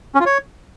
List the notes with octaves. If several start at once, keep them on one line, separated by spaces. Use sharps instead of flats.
C#4
F4
C#5